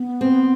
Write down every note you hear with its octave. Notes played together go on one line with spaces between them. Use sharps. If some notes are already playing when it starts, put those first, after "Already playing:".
Already playing: B3
C4